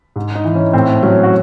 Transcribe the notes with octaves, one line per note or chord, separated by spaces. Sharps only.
G#2
D#4
E3
C#4
A2 C4
F#3 C#4
F#4